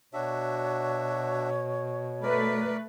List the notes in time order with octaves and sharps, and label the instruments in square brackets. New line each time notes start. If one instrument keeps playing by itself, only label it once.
[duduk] B2 [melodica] D4 F#4 E5 [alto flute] C#5
[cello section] A3 B4 [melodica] A#4 D5